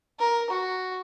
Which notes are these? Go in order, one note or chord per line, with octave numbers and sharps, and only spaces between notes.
A#4
F#4